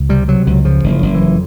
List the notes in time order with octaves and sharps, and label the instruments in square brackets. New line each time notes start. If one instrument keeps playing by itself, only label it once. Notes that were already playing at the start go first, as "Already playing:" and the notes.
Already playing: [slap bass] C#2
C3 G3
C3 F#3
C#2 F#3
C#3 F3
F#1
F3
F#1
E3
F2